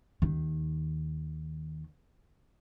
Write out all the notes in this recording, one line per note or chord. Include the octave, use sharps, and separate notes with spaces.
D#2 D#3